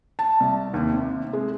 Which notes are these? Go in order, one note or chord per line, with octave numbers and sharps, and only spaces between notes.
A5
C2
D#2
C3
G#3